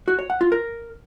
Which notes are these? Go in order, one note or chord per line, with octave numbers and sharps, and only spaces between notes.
F#4
C#5
F#5
F4
A#4